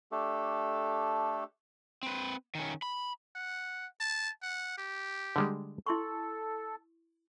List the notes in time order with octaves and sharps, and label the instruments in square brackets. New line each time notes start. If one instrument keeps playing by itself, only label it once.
[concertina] A3 D4 G4 A4
[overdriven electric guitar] C4 B4
D#3 C#4
B5
[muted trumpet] F#5
A5
F#5
G4
[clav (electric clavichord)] D3 G3 G#3
[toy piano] E4 C6 C#6 [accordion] A4